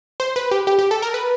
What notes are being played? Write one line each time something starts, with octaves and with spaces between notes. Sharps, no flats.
C5
B4
G4
G4
G4
A4
A#4
B4